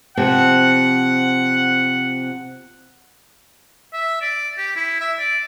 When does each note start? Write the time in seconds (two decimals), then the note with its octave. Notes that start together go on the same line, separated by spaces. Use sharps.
0.17 C3 F3 C4 F#5
3.93 E5
4.22 D5
4.58 G4
4.76 E4
5.00 E5
5.19 D5